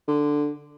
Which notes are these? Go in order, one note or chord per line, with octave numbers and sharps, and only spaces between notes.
D3